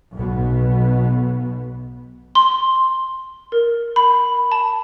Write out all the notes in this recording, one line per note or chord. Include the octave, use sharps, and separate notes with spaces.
B1 B2 B3
C6
A#4
B5
A5